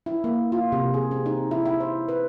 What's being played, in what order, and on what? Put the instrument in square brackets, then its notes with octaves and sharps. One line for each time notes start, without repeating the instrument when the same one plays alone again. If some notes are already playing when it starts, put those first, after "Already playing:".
[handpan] E4
A#3
F4
C3
G#4
C4
D#4
E4
E4
C5
B4